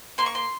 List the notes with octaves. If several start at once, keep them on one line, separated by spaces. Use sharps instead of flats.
A#3 C6
C#6
C6